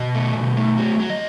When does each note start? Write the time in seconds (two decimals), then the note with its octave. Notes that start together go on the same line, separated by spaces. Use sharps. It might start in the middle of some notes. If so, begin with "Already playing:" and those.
Already playing: B2 D#5
0.14 A3
0.35 B2
0.57 A3
0.78 F#3
0.99 F#3
1.10 D#5